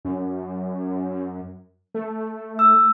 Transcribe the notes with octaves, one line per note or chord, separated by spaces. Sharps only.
F#2
A3
E6